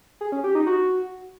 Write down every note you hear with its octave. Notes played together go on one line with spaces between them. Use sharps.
G#4
C#4
G4
D#4
F#4